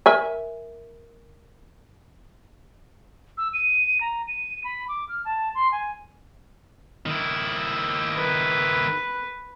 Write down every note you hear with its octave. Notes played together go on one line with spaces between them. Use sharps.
A#4 E5 G#5
E6
D#7
A#5
D#7
B5
D6
F6
A5
C6
G#5
D#3 E4
B4